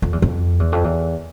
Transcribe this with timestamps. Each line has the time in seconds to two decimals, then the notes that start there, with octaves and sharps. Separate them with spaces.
0.02 F2
0.13 E2
0.22 F2
0.60 E2
0.72 F2
0.84 E2